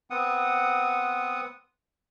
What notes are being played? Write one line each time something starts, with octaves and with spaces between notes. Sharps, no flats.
B3 C4 F#5 D#6